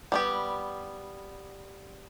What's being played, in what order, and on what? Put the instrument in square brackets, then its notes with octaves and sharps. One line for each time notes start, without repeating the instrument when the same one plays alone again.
[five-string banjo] G3 B3 G4